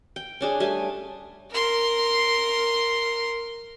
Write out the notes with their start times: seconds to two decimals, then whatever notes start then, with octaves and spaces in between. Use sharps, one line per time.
0.16 G5
0.41 C#4 D4 G#4
0.60 G3 A3 G#5
1.51 A#4 C6